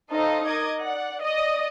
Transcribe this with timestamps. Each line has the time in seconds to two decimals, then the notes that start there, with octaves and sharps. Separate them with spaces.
0.12 D#4 A4 C5 D#5 F5
0.47 A#4 D#5 D6 G#6
0.81 D5 F#5
1.23 D5 D#5 D#6